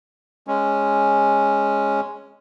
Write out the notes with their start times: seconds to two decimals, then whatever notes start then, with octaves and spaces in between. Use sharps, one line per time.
0.47 G#3 C#4